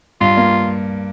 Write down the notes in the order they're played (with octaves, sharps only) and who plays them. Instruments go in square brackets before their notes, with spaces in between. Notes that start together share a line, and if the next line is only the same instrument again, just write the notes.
[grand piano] G2 [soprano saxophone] F4
[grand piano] A#3